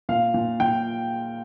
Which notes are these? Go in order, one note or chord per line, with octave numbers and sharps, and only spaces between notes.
A#2 F5
A#2
A#2 G5